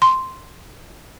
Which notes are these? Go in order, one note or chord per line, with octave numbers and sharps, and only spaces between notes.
C6